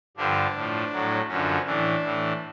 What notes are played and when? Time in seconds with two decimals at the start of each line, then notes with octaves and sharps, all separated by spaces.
0.17 G2 D3 F3 D4
0.54 A2 F3
0.92 A2 F#3
1.28 F#2 D3 F3 C#4
1.66 A2 E3 D4
2.03 A2 E3